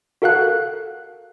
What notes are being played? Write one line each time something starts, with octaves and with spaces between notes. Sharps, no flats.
F#4 A4 A#4 F5 F#5 F#6